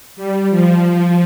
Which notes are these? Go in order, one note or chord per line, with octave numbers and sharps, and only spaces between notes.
G3
F3